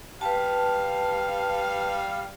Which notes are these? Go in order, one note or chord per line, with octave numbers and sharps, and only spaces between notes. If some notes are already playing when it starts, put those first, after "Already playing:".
G3 B4 F5 A5